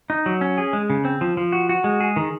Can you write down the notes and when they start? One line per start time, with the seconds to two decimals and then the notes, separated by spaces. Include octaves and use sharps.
0.10 D#4
0.26 F#3
0.41 C#4
0.58 G#4
0.73 G#3
0.90 C#3
1.05 C4
1.21 F3
1.37 F3
1.52 F#4
1.69 F#4
1.84 G#3
2.00 G#4
2.16 D#3